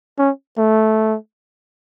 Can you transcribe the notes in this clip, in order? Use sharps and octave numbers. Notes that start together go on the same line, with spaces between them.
C#4
A3